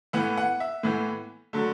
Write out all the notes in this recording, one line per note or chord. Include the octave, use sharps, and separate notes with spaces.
A2 E3 B3 F#5
F#5
E5
A2 E3 B3
D3 F#3 A3